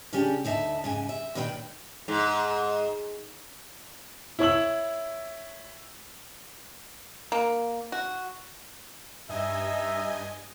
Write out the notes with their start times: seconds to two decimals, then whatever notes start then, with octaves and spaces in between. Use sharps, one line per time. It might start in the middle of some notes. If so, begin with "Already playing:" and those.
0.13 C#3 C#4 D4 G4
0.45 D2 D#4 E5 F#5 A5
0.84 G#2 C#3 G#5
1.09 E5
1.35 A#2 D#3 B4 D5 G5
2.08 G#2
4.39 E4 C#5 E6 F#7
7.32 A#3
7.92 F#4
9.29 G2 D#4 D#5 E5 G#5